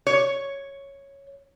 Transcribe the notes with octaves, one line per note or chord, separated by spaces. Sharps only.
C#5